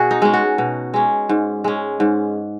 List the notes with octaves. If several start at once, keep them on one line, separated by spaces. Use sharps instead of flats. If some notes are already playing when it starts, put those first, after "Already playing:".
Already playing: B2 F#4 G#4
D#4
G#3 C#4
F#4
B2
G#3 C#4
G#2
G#3 C#4
G#2